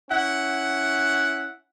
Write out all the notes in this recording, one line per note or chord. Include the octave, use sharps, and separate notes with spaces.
C#4 E4 F#5